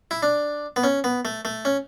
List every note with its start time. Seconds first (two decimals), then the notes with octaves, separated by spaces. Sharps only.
0.11 E4
0.23 D4
0.76 B3
0.83 C#4
1.04 B3
1.25 A3
1.45 A3
1.65 C#4